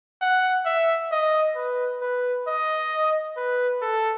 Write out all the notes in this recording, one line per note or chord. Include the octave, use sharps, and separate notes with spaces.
F#5
E5
D#5
B4
B4
D#5
B4
A4